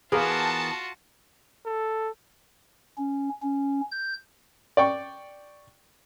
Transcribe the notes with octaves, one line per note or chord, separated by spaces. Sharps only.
E3 B3 F4 F#4 G#4 A#4 F5 A5
A4
C#4
C#4
G6
D5 G5 C#6